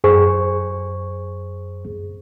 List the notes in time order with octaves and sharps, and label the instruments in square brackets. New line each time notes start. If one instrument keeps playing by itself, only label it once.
[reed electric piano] F#2 G#4 C5 C#6